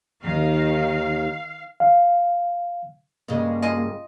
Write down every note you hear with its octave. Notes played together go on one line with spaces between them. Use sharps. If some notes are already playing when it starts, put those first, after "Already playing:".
D#2 D#3 F5
F5
G2 C#3 G#3 A#3
F4 G#4 D#5